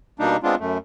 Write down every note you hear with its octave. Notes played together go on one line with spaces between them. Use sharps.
B2 G3 A#3 D4 D#4
G#3 B3 C4 D4 F4
F#2 A3